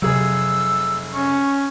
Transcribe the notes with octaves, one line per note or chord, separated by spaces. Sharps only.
F1 C3 F#3 G#4 E6
C#4 C#6